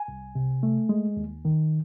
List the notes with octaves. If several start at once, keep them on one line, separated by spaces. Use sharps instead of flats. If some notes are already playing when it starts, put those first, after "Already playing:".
Already playing: G#5
C2
C3
A3
G#3
D#2
D#3